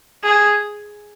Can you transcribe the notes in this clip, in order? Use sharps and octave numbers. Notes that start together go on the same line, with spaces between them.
G#4